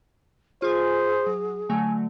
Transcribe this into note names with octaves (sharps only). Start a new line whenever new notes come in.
F4 G#4 C5 G#5
F#3
D3 F#3 A3 G#5